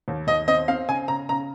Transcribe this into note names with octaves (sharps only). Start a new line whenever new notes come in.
D#2
D#2 D#5
C4 D#5
C4 F5
C#3 G#5
C#3 A#5
C#3 A#5